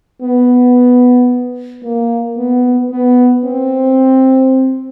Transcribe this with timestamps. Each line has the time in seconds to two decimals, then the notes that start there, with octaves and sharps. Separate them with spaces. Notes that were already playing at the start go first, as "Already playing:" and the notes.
0.22 B3
1.84 A#3
2.38 B3
2.91 B3
3.45 C4